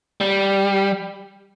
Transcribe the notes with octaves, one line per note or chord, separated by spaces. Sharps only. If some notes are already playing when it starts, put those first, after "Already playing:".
G3